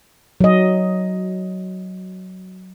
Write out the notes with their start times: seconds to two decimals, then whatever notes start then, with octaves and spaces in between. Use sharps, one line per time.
0.41 F#3 D#5